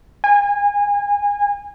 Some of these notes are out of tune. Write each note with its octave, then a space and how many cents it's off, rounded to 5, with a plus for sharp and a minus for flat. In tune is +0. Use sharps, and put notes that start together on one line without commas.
G#5 -25